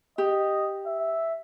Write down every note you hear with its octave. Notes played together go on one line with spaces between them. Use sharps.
G4 D#5
E5